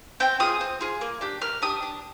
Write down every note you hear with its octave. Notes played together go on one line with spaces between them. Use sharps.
C4 G5
F4 G#4 D#6
C4
F4 G#4
A#3
D4 G4
A#3 F6
D4 G4 D#6
D4